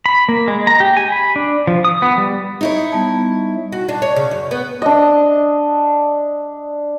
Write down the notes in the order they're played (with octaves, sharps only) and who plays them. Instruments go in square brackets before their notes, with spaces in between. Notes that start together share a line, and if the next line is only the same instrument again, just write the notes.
[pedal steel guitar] B5
A#3
G#3
A#5
G4
G#5
B5
D4
F3
D#6
B3
G3
[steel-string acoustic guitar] D#4 E4 C#5
[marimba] G3 B3 A5
[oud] F#4
D4
C#5
C#3
F#2
B3
[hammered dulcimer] D4 D#5